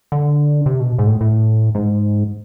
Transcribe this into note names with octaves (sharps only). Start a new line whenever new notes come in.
D3
C3
B2
G#2
A2
A2
G#2